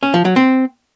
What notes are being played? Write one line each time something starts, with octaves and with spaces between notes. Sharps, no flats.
C#4
F3
F#3
C4